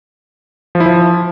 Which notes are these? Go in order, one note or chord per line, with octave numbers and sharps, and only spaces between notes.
F3
E4
F3